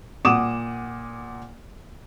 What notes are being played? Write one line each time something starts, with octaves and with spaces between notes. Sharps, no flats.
A#2 F#5 D6 D#6 E7